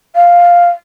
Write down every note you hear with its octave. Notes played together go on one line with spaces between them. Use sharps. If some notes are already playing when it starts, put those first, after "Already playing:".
F5